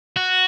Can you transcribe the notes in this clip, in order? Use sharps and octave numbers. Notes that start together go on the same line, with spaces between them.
F#4